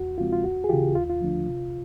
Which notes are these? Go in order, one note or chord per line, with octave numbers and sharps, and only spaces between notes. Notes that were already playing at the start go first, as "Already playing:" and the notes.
Already playing: E2 F#4
C#3 F3 G#3 C4 F4
F4
D#2 F#4
G#4
C#3 E3 F4 G4
D#2 F4
F4
D3 F3 A3 D4
C3